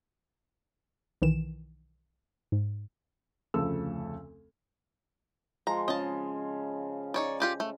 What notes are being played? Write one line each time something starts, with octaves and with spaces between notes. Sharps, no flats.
B1 D#3 E3 E7
G#2
F1 D2 C#3 F3 A4 E6
F3 G#3 A#5
C#3 D#5 A5
D#4 C#5 D5
F4 G4 D5
A3